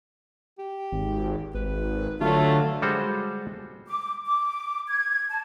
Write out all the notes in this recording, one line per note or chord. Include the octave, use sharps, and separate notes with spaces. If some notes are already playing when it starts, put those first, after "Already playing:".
G4
G#1
G#1 B4
D3 F#3 A3 F4
G3 G#3 F#4 A4 C5
D6
D6
G#6
A5